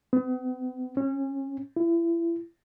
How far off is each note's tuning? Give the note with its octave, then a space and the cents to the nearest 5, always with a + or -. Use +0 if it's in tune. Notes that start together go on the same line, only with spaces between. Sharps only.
B3 +40
C#4 -25
E4 +30